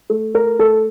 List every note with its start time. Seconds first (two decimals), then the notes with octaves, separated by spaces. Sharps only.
0.10 A3
0.34 A3 A#4
0.59 A3 A4